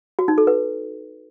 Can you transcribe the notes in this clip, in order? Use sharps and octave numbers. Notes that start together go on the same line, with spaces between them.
F#4
D#4
A4
B4